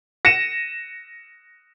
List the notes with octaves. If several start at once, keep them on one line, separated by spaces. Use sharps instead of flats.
A#6 C#7 D#7 E7